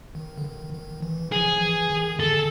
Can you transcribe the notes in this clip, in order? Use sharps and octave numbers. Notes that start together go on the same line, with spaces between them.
D#3
D3
D#3
D#3
E3
F3 G#4
E3
D#3
D3 A4